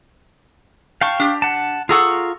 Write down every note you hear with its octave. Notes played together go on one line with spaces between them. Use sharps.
F5 G5 A5 C#6
D4 G4
F#5 A5
F4 G#4 A4 F#5 A#5 C#6